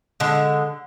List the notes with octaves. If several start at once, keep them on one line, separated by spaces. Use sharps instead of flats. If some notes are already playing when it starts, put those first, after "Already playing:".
D3 G#3